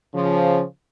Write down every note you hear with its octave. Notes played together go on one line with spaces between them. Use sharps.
C#3 F3